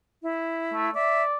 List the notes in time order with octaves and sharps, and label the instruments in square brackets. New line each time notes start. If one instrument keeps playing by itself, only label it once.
[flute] E4
[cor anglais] A3
[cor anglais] D5 [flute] E5